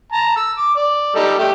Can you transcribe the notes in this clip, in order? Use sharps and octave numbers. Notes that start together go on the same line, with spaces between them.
A5 A#5
E6
D6
D5
G3 D#4 A4
A3 G4